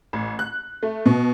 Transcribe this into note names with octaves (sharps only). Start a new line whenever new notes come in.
A1
F#6
A3
B2